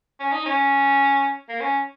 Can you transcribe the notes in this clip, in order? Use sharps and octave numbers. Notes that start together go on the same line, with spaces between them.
C#4
D#4
C#4
A#3
C#4